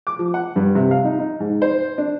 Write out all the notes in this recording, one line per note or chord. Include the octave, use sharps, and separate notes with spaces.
D6
F3
F#5
G2
C3
F5
D#4
D#4
G#2
C5
D4